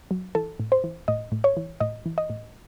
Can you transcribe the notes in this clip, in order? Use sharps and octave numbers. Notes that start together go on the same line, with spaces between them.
F#3
E3 A4
A2
C5
E3
A2 D#5
A2
C#5
E3
A2 D#5
E3
D#5
A2